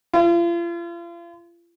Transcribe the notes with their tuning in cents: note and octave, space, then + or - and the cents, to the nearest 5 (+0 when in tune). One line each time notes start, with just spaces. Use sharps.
F4 -40